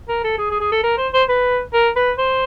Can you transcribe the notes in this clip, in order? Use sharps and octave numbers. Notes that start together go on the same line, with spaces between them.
A#4
A4
G#4
G#4
G#4
A4
A#4
C5
C5
B4
A#4
B4
C5